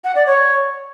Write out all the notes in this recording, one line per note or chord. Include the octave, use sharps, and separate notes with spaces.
F#5
D5
C#5